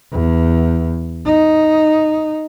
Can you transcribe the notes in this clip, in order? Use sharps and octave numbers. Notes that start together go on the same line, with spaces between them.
E2
D#4